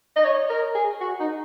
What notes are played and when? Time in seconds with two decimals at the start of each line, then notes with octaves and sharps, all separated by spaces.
0.16 D#5
0.25 C#5
0.50 A#4
0.75 G#4
1.01 F#4
1.20 D#4